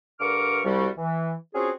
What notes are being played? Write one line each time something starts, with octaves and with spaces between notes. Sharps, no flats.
G2 D3 A#4 C#6 D6 F6
C2 G3 F#4
E3
C4 C#4 F4 F#4 G#4